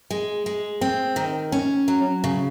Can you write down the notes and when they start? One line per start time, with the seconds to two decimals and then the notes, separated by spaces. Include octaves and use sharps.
0.10 G#3
0.46 G#3
0.81 C4
1.16 D#3
1.52 C#4
1.88 F#3
2.24 C#3